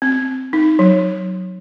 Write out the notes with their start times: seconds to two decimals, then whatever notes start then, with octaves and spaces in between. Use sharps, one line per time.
0.02 C4
0.53 D#4
0.79 F#3